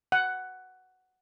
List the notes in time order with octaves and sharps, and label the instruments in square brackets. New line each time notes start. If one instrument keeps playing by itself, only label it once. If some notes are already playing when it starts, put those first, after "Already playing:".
[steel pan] F#5